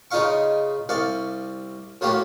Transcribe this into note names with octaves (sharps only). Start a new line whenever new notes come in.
C#3 D#4 F4 D#5 F5 C#6
C2 D5 F5 C#6
A2 F#3 A#3 F4 G4